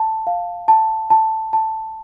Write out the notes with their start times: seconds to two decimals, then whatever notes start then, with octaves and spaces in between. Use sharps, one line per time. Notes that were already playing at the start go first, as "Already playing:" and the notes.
Already playing: A5
0.27 F5
0.68 A5
1.10 A5
1.53 A5